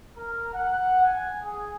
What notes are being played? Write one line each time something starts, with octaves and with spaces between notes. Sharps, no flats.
A#4
F#5
G#5
G#4